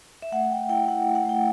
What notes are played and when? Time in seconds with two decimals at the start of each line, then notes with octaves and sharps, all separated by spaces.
0.22 E5
0.32 A3 F#5
0.51 A3 G5
0.69 E4 G5
0.88 E4 F#5
1.02 A3 F#5
1.15 F#5
1.25 A3 G5